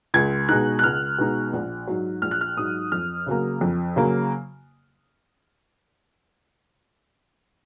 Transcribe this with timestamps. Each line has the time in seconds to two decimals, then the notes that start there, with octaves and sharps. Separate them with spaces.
0.14 C#2 G#6
0.49 B2 G#3 D#4 F#6
0.79 F#6
0.83 C#2 F6
1.18 B2 G#3 D#4
1.53 A#1
1.87 G#2 F#3
2.22 A#1 F6
2.31 F#6
2.41 F6
2.57 G#2 F#3 D#6
2.92 F2 F6
3.26 C#3 F#3 A#3
3.61 F2
3.96 C#3 F#3 A#3